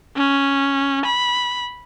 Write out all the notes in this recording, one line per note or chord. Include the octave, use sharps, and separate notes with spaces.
C#4
B5